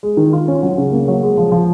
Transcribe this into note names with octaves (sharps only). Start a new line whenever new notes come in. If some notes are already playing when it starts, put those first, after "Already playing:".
G#3
D#3
F4
C#4
F#3
C#3
A#3
F#3
G#3
F3
F3